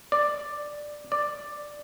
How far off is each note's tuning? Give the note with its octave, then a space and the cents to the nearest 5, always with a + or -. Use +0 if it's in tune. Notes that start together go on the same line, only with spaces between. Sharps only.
D5 +5
D5 +5